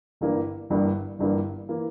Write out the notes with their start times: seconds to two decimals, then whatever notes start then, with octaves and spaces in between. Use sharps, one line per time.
0.21 G1 G2 E3 A#3
0.70 G1 G2 E3 A#3
1.19 G1 G2 E3 A#3
1.69 E3 A#3